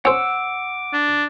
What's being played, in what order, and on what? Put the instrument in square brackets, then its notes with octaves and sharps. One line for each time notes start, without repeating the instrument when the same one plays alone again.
[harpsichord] C#4 C5 [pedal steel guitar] F#5 E6 [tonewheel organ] D6
[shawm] D4